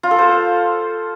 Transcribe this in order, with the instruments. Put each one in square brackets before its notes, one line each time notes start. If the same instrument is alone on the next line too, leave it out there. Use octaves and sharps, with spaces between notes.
[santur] F4
A4
C5